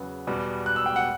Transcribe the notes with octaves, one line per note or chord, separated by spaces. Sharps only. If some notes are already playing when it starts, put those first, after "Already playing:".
Already playing: E2 C#3 F#3 B3
E2 B2 G3 B3
F#6
E6
G5
F#5